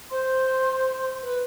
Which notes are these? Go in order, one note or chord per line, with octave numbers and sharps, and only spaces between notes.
C5 C6
B4